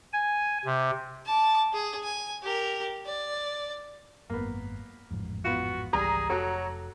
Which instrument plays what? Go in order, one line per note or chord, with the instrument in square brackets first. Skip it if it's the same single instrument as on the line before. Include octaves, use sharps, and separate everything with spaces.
[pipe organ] G#5
C3
[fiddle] A5 D6
G#4
G#5
G4 A#4
D5
[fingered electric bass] G#1 F#2 [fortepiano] A#3 B3
[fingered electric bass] A1 F2 G#2
[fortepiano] B3 F4 [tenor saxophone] F#4
[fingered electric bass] G#1 C#2 E3 [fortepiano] G3 [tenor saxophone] G#4 [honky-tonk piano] A#5
[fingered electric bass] F1 [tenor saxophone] F#3 [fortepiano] F#4 G4 A4